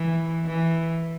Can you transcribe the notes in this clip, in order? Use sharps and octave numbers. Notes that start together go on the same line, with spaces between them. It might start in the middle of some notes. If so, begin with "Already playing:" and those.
Already playing: E3
E3